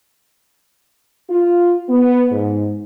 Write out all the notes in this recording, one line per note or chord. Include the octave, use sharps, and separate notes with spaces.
F4
B3
G#2